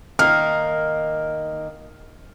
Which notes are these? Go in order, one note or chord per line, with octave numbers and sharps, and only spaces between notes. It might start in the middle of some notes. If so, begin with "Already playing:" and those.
D#3 A#3 F6